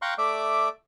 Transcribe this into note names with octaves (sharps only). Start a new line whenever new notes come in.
F5 G5 A#5 C6 C#6 F#6
A3 D5 E5 D6